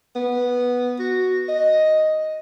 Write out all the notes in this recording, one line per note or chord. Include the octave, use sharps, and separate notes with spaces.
B3
F#4
D#5